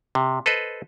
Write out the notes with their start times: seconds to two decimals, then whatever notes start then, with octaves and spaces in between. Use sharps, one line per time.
0.15 C3
0.46 A4 B4 C5 D#5